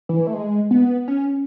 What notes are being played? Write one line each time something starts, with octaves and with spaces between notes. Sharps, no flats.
E3
A3
G#3
B3
C#4